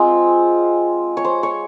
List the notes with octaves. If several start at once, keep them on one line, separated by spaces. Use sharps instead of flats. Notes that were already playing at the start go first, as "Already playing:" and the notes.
Already playing: G#3 C4 F4 C5
C#5
C5
C#5